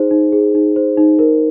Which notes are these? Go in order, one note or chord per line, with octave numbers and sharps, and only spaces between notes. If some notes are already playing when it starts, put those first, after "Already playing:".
Already playing: D#4 G#4 C5
D#4
G#4
D#4
C5
D#4
A#4